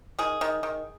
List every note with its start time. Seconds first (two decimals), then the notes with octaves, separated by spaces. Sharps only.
0.19 D#3 G#4
0.41 D#3
0.63 D#3